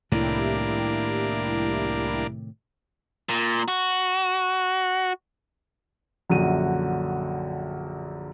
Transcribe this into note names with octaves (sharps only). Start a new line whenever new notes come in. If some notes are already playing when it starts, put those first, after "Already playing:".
C2 A2 C3 D#3 A#3 D4 E4 G4
A#2
F#4
A#1 F#2 D3 F#4 D#7